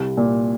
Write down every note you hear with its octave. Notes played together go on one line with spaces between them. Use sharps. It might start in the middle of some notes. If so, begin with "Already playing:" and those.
Already playing: C2
A#2